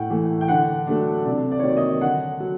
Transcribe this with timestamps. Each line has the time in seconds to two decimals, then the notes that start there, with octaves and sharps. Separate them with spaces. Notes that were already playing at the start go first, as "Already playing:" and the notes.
Already playing: A2 F#5 G5
0.10 E3 A3
0.41 G5
0.48 D3 F#5
0.87 F#3 A3 D4
1.25 C3 D5
1.51 D5
1.59 C#5
1.63 D#3 F#3 A#3 D5
1.77 D#5
2.01 D3 F#5
2.40 F#3